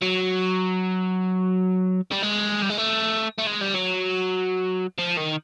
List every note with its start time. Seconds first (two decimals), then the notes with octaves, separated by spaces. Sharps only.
0.02 F#3
2.12 G3
2.23 G#3
2.62 G3
2.70 G#3
2.78 A3
3.38 A3
3.46 G#3
3.61 G3
3.74 F#3
4.98 F3
5.17 D#3